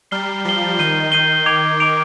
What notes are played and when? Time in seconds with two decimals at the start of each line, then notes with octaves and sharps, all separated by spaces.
0.11 G3 A#5 F6 C7 G7
0.45 F3 A#5 F6 C7 G7
0.79 D#3 G6 C7 D#7 G7
1.12 G6 C7 D#7 G7
1.46 D6 G#6 D7 F7
1.80 D6 G#6 D7 F7